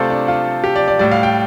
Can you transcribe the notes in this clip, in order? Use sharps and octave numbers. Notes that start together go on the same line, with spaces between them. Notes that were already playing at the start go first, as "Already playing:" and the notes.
Already playing: C3 A3 F4 A4 C5 D5
D4
F4
G4
D5
D5
A2 G3 D5
F5
G5